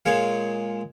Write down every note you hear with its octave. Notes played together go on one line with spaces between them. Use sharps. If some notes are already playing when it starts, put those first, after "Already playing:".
A#2 G#3 C#5 F5